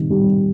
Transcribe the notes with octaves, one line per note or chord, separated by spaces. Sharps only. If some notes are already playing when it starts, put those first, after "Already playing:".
Already playing: C3 D#3 G3
G3